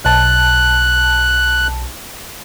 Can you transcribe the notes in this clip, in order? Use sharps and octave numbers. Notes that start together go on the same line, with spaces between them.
B1 A5 F#6